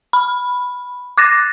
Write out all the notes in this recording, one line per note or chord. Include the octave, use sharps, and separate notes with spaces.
B5
D6 F#6 A6 A#6